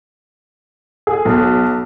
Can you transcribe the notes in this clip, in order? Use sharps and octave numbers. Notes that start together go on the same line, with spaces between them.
G#4
B1